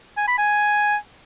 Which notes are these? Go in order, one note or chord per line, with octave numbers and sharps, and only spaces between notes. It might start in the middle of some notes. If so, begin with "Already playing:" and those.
G#5
B5
G#5